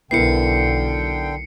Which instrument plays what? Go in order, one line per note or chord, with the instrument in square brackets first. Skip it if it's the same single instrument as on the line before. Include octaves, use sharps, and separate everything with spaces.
[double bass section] B1 [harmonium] D3 G5 [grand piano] B3 E4 A#4 [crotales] C7 C#7